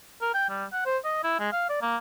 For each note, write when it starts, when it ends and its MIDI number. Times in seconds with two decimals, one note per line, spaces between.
0.22 0.34 70
0.34 0.49 79
0.50 0.65 55
0.73 0.82 78
0.86 0.98 72
1.05 1.19 75
1.24 1.36 64
1.39 1.51 56
1.53 1.66 77
1.69 1.82 74
1.82 1.97 58